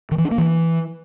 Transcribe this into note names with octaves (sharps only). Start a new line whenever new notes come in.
D#3
E3
D4
A#3
E3